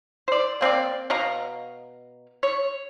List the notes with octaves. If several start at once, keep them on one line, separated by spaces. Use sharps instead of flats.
C5 D5
A#3 C4 A4 D5
B2 D#5 F5 A#5
C#5